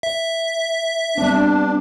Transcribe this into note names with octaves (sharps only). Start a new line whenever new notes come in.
E5
G3 B3 C4 D4